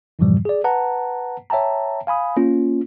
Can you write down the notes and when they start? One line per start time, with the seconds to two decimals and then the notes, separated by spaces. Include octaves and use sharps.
0.19 F2 G#2 B2 E3 F3 G3
0.45 G#4 D5
0.64 B4 F#5 A5 A#5
1.50 C#5 E5 G5 A5 A#5
2.07 F5 G#5 B5 D#6
2.37 A#3 C#4 F4